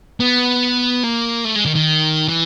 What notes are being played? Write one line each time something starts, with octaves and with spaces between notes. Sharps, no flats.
B3
A#3
A3
G#3
D#3
D#3
E3